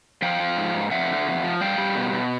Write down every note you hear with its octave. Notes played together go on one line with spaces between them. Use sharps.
F3 F5 G5
F3
G#2
G#2
F2 E5 F#5
D3
F2
F3
G3 F5 G5
G3
B2
B2